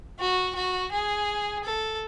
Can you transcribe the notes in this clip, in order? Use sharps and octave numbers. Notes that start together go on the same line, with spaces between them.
F#4
F#4
G#4
A4